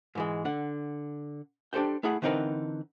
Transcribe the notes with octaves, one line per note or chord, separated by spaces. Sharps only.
G#2 E3 G#3
D3 F#5
D4 G4 A4 C5 G5
A3 E4 G#4 F#5 B5
D3 E3 C4 D#4 A#4 B4